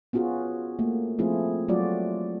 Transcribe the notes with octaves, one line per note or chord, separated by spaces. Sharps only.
B3 C#4 F4 F#4 G#4
A3 A#3
F3 A3 C4 E4 F4 G#4
F#3 G3 A3 F4 F#4 D5